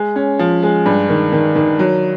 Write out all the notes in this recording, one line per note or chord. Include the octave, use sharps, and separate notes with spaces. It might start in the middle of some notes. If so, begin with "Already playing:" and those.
Already playing: G#3
C#4
F3
G#3
G2
D#3
D#3
D#3
F#3